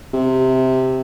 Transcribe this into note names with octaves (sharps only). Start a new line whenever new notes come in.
C3